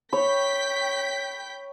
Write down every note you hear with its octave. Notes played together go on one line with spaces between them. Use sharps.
C#5 G5 B5 G6 B6